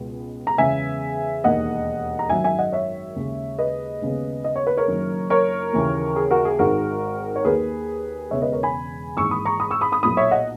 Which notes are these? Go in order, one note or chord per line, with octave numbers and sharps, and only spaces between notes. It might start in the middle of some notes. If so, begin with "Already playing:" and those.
Already playing: C#2 B2 G#3 B3
A#5
E2 C#3 G#3 B3 E5 G#5
E1 D#2 D#3 A#3 D#5 F#5
A#5
G#1 F#2 D#3 F#3 E5 G#5
E5 G#5
D#5 F#5
C#5 E5
D#2 C#3 G#3
B4 D#5
D#2 C#3 G#3 B3
D#5
C#5
B4
A#4 C#5
F#1 F#2 D#3
A#4 C#5
D#2 C#3 E3 A#3
G#4
F#4 A#4
G#4
G#1 G#2 D#3 G#3 F#4 A#4
C#5
D#2 D#3 A#3 G#4 B4
E1 E2 C#3 G#3 B3 C#5 E5
B4 D#5
A#4 C#5
G#5 B5
G#1 G#2 E3 A#3 C#6 E6
B5 D#6
A#5 C#6
B5 D#6
C#6 E6
B5 D#6
B5 D#6
B1 A#2 A#3 B5 D#6
C#5 E5
D#5 F#5